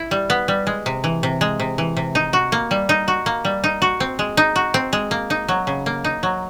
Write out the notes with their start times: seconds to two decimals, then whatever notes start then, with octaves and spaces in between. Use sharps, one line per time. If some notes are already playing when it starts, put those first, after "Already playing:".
Already playing: E4
0.11 G3
0.30 B3
0.48 G3
0.67 G#3
0.86 C3
1.04 E3
1.23 C3
1.41 G#3
1.60 C3
1.78 E3
1.97 C3
2.15 D#4
2.33 F#4
2.52 A#3
2.71 G3
2.89 D#4
3.08 F#4
3.26 A#3
3.45 G3
3.64 D#4
3.82 F#4
4.00 C4
4.19 G#3
4.37 D#4
4.56 F#4
4.74 C4
4.93 G#3
5.11 A#3
5.30 D#4
5.48 F#3
5.67 C#3
5.86 A#3
6.04 D#4
6.23 F#3